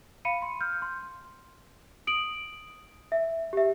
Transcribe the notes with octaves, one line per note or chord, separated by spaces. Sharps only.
F5 B5 C#7 D#7
C6
F6 G6
C6
D#6 D7 F#7
E5
G4 E5